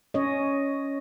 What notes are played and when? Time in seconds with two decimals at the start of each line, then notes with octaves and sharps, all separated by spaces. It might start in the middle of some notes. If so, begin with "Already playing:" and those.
0.14 C#4 C#5 D#5